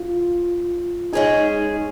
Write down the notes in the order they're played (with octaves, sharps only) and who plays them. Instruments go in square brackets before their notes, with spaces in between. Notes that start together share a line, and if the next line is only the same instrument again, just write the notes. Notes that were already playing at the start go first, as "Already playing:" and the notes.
Already playing: [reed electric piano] F4
[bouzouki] G#3 C#4 G#4 [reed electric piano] D#4